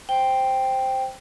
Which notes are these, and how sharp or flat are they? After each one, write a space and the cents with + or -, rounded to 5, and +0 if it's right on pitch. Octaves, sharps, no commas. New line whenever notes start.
C5 +0 G5 +0